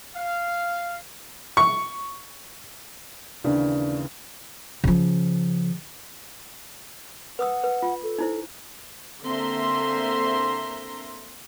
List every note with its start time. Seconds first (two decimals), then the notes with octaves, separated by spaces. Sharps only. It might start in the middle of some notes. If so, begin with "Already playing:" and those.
0.15 F5
1.57 C#6
3.44 D#2 C#3 E3 D4
4.84 C#3 F3
7.39 B4 F#5 D#6 E6
7.64 B4
7.82 F4
8.03 A4
8.19 D#4 E4 C5
9.23 D3 A#3 C4 E5 A#5 C6